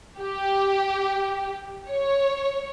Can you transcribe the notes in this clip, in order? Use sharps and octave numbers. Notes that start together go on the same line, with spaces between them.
G4
C#5